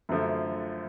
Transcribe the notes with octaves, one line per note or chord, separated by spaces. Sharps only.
F#2 D3 F3 A3